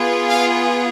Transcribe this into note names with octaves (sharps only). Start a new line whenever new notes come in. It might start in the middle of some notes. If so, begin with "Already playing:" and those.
Already playing: B3 F4 G#4
F5